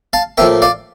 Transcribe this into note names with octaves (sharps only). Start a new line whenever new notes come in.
F5 A5
A2 F3 A#3 E5 G5
D5 F5